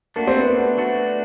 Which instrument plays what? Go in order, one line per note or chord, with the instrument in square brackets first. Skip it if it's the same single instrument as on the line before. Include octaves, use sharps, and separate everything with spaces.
[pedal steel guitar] A3 D4 F#4 [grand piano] A#3
[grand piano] C4
B3
B3
[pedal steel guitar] A3 D4 F#4